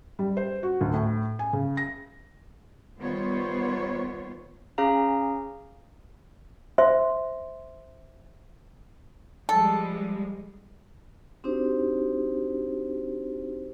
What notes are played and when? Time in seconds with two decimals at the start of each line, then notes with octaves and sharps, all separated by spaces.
0.19 G3
0.37 C5
0.63 F#4
0.81 D2
0.93 A2
1.39 G#5
1.53 C#3
1.77 A#6
2.99 D#3 G3 B3 F4 C5 C#5
4.78 C#4 G#4 F5 A#5
6.78 C5 E5 C6
9.49 F3 G3 G#3 A4
11.44 C4 D4 D#4 F#4 G4 C5